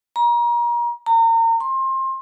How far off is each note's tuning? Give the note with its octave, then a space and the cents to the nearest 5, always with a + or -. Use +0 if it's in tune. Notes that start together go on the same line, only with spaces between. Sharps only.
A#5 +30
A#5 -35
C6 +25